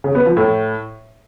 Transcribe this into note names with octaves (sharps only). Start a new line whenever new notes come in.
C#3
B3
F3
A2